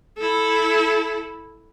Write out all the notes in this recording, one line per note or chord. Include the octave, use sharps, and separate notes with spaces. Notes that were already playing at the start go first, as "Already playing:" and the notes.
E4 A4